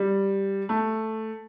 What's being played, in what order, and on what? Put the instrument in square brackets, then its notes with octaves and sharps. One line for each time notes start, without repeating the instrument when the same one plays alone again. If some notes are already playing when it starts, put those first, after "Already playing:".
Already playing: [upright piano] G3
A3